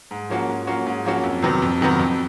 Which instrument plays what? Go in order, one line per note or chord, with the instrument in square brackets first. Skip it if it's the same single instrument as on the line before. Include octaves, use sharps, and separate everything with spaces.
[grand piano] G#2
F3 A#3 C#4 F#4
G#2
F3 A#3 C#4 F#4
G#2
F3 A#3 C#4 F#4
F2
C3 D#3 F#3 B3
F2
C3 D#3 F#3 B3
F2